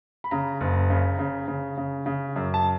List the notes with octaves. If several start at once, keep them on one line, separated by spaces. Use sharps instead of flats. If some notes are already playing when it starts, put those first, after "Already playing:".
B5
C#3 A#5
F#1
C#3
C#3
C#3
C#3
C#3
F#2
A5